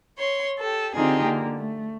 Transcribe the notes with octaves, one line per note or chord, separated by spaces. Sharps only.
C#5 C6
G4 A4
D3 C4 D#4 F4 G4 G#4
D3 A#3
A3